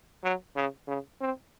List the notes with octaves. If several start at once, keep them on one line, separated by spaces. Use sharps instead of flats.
F#3
C#3
C#3
C4